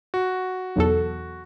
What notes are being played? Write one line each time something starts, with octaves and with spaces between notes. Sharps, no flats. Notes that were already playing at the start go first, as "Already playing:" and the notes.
F#4
B1 E2 A4